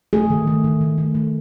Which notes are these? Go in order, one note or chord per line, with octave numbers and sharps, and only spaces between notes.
A3 G#4
D#3
A3
D#3
D#3
A3
A3